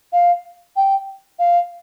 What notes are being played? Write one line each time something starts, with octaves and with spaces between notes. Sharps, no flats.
F5
G5
F5